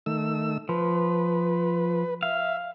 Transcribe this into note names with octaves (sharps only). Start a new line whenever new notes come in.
D#3 A3 E6
F3 B4
E5 F5